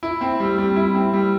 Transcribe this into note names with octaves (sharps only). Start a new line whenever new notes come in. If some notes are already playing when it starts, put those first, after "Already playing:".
E4
C4
G3
G3
E4
C4
G3